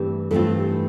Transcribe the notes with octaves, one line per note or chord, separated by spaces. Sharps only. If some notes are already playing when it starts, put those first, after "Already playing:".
Already playing: G2 E3 A3 C4 G4
G2 E3 A3 C4 F4 A4
G4